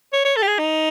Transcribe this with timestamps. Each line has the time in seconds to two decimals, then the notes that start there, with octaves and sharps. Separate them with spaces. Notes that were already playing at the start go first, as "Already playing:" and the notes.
0.13 C#5
0.25 C#5
0.37 A4
0.42 G4
0.47 G#4
0.59 D#4